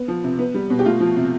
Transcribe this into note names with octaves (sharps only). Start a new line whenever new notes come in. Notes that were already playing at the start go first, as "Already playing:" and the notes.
Already playing: B3
F3
C3
B3
G3
B2
G4
A3 F4
F3
C3